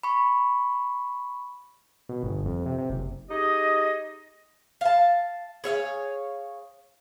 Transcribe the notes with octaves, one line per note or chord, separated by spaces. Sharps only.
B5 C#6
B2
G1
F2
C3
C3
F#1
D#4 G4 G#4 D#5
F5 A5
G#4 C#5 E5 F5